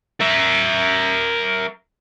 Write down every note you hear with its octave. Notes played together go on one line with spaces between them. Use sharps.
A#4 E5